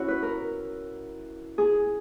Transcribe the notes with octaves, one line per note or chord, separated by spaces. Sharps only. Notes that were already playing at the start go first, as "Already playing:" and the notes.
Already playing: C#4 E4 F#4
B4
A#4
G#4